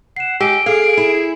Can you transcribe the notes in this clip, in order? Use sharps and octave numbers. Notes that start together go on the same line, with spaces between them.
F#5 C7 E7
G#3 G4 E6 D7
G#4 A4 F5
E4